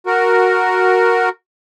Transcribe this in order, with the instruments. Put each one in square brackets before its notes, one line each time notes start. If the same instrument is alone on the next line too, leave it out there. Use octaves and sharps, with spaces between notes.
[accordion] F#4 A#4